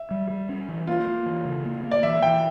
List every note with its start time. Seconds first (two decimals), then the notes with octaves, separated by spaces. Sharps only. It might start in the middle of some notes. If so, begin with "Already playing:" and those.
Already playing: E5
0.11 G3
0.30 G3
0.49 C#4
0.68 E3
0.87 A#3 F4
1.07 A#3
1.26 E3
1.45 C#3
1.65 A#3
1.84 A#3
1.91 D5
2.03 E3 E5
2.22 E3 G5